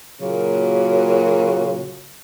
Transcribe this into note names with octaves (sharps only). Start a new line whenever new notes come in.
A#2 C#3 F#3 A#3 F#4